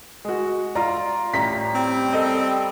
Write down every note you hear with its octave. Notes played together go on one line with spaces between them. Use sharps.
G#3 F#4
F4 D5 A#5
A1 G3 A#5 B6
G3 C4
A4 D#5